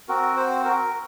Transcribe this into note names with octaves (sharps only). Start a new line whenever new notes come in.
C4 F#4 A#4
C5
A#4